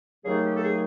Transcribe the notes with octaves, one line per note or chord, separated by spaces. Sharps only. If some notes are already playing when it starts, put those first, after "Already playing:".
D#2 C#3 F#3 A3 G#4
G4
A4
G#4